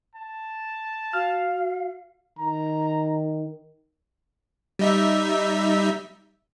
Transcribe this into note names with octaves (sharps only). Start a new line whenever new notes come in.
A5
F#4 F5 F6
D#3 A#5
G3 D#4 E5